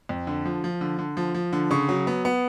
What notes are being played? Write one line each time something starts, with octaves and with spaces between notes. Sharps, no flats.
F2
D3
F3
F3
D3
D3
F3
F3
D3
C#3 C#6
F#3
B3
B3